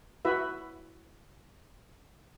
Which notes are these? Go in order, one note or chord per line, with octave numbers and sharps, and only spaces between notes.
E4 F#4 B4 E5